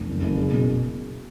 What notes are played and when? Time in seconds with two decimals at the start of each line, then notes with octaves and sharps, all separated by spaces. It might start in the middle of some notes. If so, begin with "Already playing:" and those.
Already playing: F1
0.09 F#1
0.22 F#1
0.37 G#4
0.52 B2